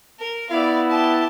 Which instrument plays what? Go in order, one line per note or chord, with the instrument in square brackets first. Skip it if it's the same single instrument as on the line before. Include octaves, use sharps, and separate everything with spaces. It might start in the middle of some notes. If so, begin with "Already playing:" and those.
[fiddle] A#4
[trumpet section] B3 E4 [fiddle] D5 F5
[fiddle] G4 A5